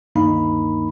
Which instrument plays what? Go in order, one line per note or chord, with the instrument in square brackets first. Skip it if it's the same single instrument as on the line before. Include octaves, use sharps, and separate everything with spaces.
[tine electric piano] D2 G2 D#3 A#3 D#4 B5